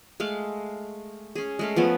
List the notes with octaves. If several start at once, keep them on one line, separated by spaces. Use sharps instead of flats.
G#3 A3 F5
C#4 G#4
G#3 A3 F5
F3 A3 B3 C#4